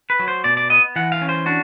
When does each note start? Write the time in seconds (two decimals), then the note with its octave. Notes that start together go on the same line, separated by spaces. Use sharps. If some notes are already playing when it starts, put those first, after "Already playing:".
0.10 B4
0.19 F#3
0.28 C5
0.44 B2 D5
0.57 D5
0.70 B3 D#5
0.96 E3 F#5
1.12 F5
1.21 C#4
1.29 C5
1.46 D4 F#4